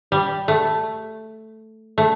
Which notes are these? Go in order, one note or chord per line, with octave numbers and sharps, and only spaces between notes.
G3
A3
A3